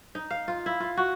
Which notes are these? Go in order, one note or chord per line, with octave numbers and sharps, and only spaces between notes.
D#4
F5
F4
E4
F4
F#4